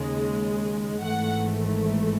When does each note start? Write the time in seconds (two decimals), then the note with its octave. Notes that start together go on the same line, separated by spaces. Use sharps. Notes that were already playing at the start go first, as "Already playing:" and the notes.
Already playing: D#2 C#3 G#3
1.04 G#1 G#2 E3 A3 F#5